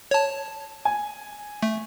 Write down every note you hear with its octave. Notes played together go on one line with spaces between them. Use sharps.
C#5 A5
G#5
A3